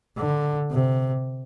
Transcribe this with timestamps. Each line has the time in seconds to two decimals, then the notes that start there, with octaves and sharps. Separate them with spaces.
0.17 D3
0.71 C3